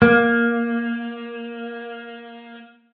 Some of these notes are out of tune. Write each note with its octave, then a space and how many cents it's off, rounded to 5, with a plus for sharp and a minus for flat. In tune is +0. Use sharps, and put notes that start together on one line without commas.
A#3 +10